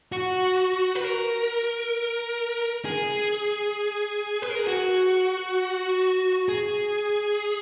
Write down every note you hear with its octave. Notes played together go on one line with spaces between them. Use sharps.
F#4
B4
A#4
G#4
B4
A#4
G#4
F#4
G#4